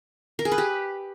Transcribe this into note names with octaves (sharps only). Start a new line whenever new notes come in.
A#4
G#4
B4
G4